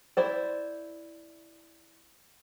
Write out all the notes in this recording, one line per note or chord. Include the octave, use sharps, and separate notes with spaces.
E4 C5 D5